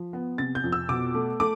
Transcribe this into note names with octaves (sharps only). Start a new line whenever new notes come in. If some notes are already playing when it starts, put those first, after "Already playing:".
Already playing: F3
B3
C3 A6
G6
F2
E6
B2 D6
A3
A3 D6